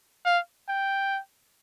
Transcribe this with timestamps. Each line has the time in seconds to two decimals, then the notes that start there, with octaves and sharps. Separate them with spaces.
0.25 F5
0.69 G5